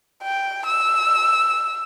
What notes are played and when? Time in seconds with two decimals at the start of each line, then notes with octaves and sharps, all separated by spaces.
0.23 G5
0.66 E6